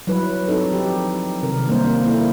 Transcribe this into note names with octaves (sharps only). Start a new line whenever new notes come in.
F#3 G3 E4 B4
C4 D#4 A4
F3 G4
C3 D#3 A#4
G3 A#3 D4 A#4 C5
A#3 E4 A4